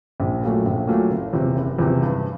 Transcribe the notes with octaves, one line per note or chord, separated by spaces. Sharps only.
A#1
A#2 F#3 A3
A#1
A#2 F#3 A3
F#1
E2 C3
F#1
E2 C3
G2